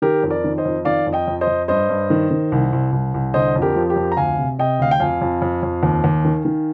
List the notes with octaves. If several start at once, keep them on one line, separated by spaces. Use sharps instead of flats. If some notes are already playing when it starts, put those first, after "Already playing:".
D#3 G4 A#4
F2
A#4 D5
D#3
C5 D#5
F2
D#3 D5 F5
F2
D#5 G5
F2
C5 D#5
F2
G2 C5 D#5
G2
D#3
D#3
C2
C2
C2
C2
D3 C5 D#5
F2
G4 A#4
F3
G4 A#4
F2
A#5
D2 F5 G#5
C3
C3 D#5 G5
D2 F5
G5
F2 F5 G#5
F2
F2
F2
D#2
D#2
D#3
D#3